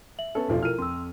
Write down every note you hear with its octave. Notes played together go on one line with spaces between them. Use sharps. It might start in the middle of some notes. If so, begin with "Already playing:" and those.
E5 F#7
B3 C#4 A4
F1 B1 F3
E4 F4 A#4 F6 D#7
F2 C6 E6